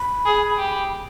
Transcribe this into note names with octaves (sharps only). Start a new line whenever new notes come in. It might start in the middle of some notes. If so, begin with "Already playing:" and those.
Already playing: B5
G#4
G4